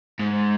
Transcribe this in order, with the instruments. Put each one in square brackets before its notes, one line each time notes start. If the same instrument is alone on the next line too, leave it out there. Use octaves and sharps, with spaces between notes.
[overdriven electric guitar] G#2